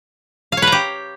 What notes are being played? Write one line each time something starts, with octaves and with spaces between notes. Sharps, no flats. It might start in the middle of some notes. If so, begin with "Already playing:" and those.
F5
C#5
B4
A#5
G4